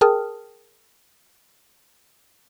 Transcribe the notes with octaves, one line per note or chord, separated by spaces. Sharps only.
G#4 A#4 G5 A5 D#6 F6